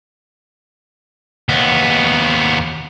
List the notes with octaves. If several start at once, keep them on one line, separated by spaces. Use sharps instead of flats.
D#2 B3